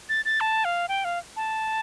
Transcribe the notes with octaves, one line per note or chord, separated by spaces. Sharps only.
A6
A6
A5
F5
G5
F5
A5